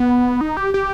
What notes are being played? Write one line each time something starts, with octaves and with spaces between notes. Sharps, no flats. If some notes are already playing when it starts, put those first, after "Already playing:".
Already playing: B3
D#4
G4
G4